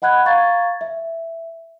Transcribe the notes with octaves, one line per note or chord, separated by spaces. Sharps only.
D#5 F#5 B5 F#6 G#6
F5 A#5 C#6 G#6 A6
E5